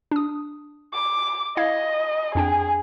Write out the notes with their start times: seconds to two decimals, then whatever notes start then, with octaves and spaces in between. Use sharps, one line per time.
0.11 D4 D#6
0.93 D6
1.57 E4 D#5 F5 G#6
2.35 F2 D4 G#4 G5